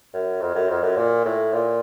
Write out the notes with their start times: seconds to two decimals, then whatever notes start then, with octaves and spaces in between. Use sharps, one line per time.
0.13 F#2
0.41 F2
0.55 F#2
0.69 F2
0.83 F#2
0.97 A#2
1.25 A2
1.53 A#2